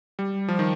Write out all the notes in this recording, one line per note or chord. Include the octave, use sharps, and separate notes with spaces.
G3
F3
D#3